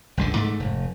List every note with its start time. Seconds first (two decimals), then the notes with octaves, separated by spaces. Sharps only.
0.17 G1 C#2 D3
0.36 G#2 A3
0.60 F1